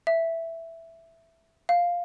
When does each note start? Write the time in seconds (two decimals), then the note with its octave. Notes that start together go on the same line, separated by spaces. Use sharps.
0.07 E5
1.69 F5